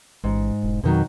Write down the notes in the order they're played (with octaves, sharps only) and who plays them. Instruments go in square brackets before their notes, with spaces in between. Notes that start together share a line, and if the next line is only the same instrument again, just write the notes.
[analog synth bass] A1 [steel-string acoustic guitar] G#2
[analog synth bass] E1
[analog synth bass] F2 [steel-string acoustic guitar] B2 D#3 F#3